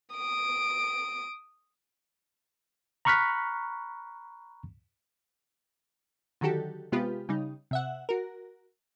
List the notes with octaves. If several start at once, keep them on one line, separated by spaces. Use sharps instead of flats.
D#6 D7
A#5 B5 C#6 F6 F#6 B6
D3 D#3 F#3 F#4 G4 A4
C3 G#3 B3 F4 G4 B4
C#3 G3 D#4
C3 E5 F#5
F#4 A#4